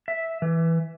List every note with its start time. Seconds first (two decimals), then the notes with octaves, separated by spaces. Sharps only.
0.08 E5
0.42 E3